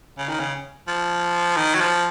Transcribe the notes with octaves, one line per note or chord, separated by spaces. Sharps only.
C#3
D#3
C#3
F3
D#3
F#3
F3